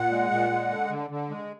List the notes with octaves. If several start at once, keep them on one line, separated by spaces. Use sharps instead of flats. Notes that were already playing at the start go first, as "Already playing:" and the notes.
Already playing: A#2 F#5
G#3
A#2
G#3
D3
D3
D3
G#3